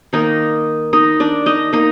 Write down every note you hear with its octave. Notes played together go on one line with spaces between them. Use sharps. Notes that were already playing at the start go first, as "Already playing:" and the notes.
D#3 A#3 D#4 D#5
D#4 D#5
D4 D5
D#4 D#5
A#3 D#4 D#5